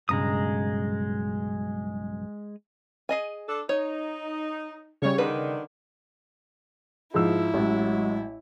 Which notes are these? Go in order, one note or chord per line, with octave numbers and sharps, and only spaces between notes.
B1 G2 C#3 G#3 A#5 D#6
G#4 D#5 G#5
D4 A4
D#4 C#5
C#3 G3 C#5
D3 D#3 B4
G#2 F3 E4 E6
A1 F#3 G#3